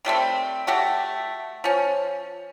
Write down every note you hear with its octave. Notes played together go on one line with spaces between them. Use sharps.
D#3 G3 A3 C4
A3 F#4 G4
F3 C#4